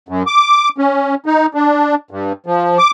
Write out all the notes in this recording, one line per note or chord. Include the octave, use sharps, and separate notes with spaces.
F#2
D6
C#4
D#4
D4
G2
F3
D6